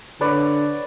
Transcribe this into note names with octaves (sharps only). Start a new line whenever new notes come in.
D3 B4 C#5 D5